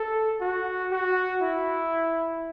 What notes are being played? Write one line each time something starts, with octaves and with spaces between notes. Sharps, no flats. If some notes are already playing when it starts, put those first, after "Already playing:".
Already playing: A4
F#4
F#4
E4